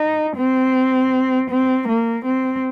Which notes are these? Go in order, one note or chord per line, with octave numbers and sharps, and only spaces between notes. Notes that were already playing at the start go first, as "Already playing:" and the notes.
Already playing: D#4
C4
C4
A#3
C4